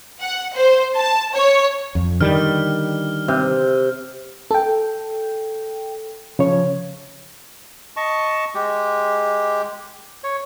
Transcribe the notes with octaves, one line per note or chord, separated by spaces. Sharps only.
F#5
C5
A5
C#5
F2
D3 D#3 G3 F6
C3
A4 G5
C#3 F3 C#5
D#5 A5 C#6
G#3 G4
C#5